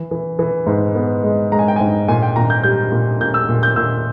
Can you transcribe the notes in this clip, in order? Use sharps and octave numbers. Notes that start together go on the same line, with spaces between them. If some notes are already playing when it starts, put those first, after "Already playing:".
Already playing: E3
E3
E3
G#2
B3
G#3
G#3 A#5
G#5
G5
G#2 G#5
A#2 G#5
G5
A#2 A#5
G6
G3 G6
A#2
A#2 G6
E6
A#2
G6
A#2 E6